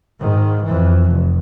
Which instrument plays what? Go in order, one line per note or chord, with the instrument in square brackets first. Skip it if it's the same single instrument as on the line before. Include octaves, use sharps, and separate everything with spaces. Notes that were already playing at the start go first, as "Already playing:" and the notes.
[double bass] G#2 D#3
F2 E3
F1